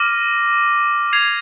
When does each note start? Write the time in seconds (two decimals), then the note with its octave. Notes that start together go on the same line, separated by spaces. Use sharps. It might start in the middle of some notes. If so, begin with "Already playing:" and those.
Already playing: D6 F6 A#6 D#7
1.13 G#6 C7 F7